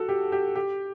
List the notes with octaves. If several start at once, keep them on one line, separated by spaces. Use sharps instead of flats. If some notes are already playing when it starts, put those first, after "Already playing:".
Already playing: F#4 A4
G4
G4
G4